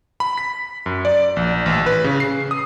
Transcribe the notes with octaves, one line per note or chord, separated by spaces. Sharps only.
B5
B6
F#2
D5
A#1
A1
B4
C#3
C7
D#6